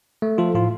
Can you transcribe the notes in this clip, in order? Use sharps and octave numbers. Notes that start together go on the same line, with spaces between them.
A3
F3 F4 A4
A2 F4